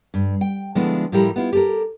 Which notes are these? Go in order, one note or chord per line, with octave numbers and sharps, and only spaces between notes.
G2
G5
D3 F3 G#3 A3 B3 E4
A2 F3 G3 E4 G4 A#4
B3 E4 F4
G4 A4 A#4